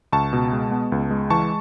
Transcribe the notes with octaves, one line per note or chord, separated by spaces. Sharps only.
C#2 A5 C#6
B2
G#3
B3
C#2
G#3
E3 A5 C#6